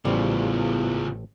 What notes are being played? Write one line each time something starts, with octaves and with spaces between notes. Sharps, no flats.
A1 E2 C#3 F3 G3 C#4 C5